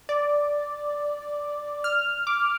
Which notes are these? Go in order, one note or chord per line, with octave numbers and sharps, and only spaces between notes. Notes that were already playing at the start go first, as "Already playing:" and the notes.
D5
F6
D6